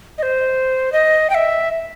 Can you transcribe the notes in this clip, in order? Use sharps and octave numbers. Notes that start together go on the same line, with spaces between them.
D#5
C5
D#5
G5
E5